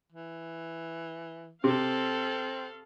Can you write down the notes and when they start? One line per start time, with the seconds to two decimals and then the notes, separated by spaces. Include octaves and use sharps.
0.12 E3
1.64 C3 C4 A4 F5